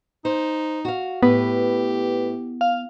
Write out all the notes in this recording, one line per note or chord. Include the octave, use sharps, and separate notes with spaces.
D#4 C5
F#4 F5
A2 B3 G4 B4
F5